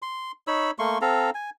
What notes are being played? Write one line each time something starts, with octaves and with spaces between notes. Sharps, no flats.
C6
D#4 C#5 B5 E6
A3 A#3 C6 C#6
C4 A4 F5 A#5
G#5